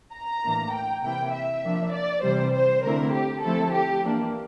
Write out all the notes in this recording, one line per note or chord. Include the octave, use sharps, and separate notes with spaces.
A#5
A2 E3 A#3 D4
G5
C3 E3 A#3 E4 G5
E5
F3 A#3 D4
D5
C3 E3 G3 C5
C5
D3 A3 C4 E4 A#4
G4
F3 A3 C4 E4 A4
G4
E3 A#3 D4